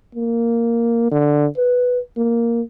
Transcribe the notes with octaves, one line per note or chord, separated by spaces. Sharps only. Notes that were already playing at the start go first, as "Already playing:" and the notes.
A#3
D3
B4
A#3